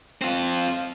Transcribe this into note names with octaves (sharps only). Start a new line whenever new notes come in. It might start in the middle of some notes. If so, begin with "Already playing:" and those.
C4 F4